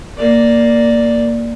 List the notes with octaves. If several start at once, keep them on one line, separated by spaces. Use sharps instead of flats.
A#3 D5